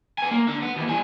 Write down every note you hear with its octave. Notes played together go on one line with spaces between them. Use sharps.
B3 G#5
A#3
D3
B3
D#2 E3
G3 G#5